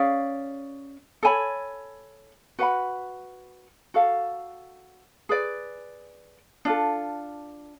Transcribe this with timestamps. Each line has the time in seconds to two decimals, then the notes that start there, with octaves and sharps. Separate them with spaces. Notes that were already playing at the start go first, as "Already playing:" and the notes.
Already playing: C#4 G#4 D5 F5
1.23 A4 C#5 G#5 B5
2.59 F#4 B4 F#5 B5
3.94 F#4 A4 F5
5.29 G#4 B4 D5
6.65 D4 F4 A4